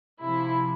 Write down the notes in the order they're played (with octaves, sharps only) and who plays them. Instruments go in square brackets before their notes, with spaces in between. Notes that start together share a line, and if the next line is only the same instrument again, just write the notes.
[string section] C3 F3 E4